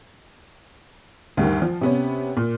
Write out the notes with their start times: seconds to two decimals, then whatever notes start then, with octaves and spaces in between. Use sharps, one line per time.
1.37 D2 G2 D#3
1.62 F3
1.81 C3 B3 C#4
2.37 A#2